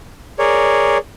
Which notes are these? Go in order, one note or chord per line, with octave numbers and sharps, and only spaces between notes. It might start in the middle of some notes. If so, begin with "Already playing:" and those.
G#4 A#4 C#5 D5